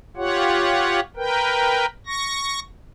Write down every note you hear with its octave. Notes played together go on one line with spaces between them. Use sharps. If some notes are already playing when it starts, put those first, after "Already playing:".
F4 G4 C#5 F#5
A#4 B4 G5
C#6 A#6